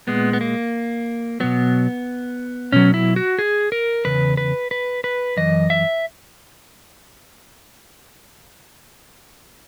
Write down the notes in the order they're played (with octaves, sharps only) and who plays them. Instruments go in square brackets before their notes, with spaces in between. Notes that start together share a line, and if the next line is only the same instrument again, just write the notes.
[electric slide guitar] A#2 G#3 B3
B3
A#3
B2 F#3 B3
B2 F#3 C#4
E4
F#4
G#4
A#4
E2 C#3 B4
B4
B4
B4
F#2 E3 D#5
E5